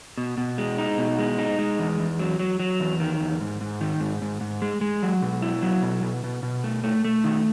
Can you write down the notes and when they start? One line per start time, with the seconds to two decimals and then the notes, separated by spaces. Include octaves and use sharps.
0.18 B2
0.38 B2
0.58 G#3
0.78 D#4
0.98 B2
1.19 G#3
1.39 D#4
1.59 G#3
1.79 E2
1.99 E2
2.19 F#3
2.39 F#3
2.60 F#3
2.80 E2
3.00 D#3
3.21 E2
3.41 G#2
3.61 G#2
3.81 D#3
4.01 G#2
4.22 G#2
4.41 G#2
4.62 G#3
4.81 G#3
5.03 F#3
5.22 B2
5.42 E4
5.63 F#3
5.82 B2
6.03 B2
6.24 B2
6.43 B2
6.64 A3
6.84 A3
7.05 A3
7.24 D#3